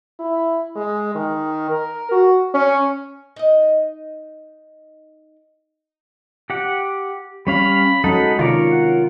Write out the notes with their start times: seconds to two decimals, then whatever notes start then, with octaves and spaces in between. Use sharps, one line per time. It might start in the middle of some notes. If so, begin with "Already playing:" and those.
0.20 E4
0.76 G#3
1.15 D#3
1.70 A#4
2.12 F#4
2.54 C#4
3.36 D#4 D#5
6.50 G4 F#5
7.47 G3 C#4 F5 B5
8.04 F#3 G#3 C#4 D#4 A4 F#5 B5
8.39 C3 D#3 F4 A#4 C#5 D5
8.71 F#5